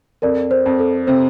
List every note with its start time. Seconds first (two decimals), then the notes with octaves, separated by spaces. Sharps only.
0.22 F2 A#4 D5
0.51 C5
0.66 F2
0.79 A4
1.07 C3 C5